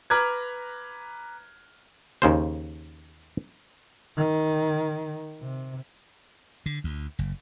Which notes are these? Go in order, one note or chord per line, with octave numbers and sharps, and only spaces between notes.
B4 A#5 D6 F6 F#6 G#6
D#2 C#3 C5
D#3
C3
D3
D2
F#1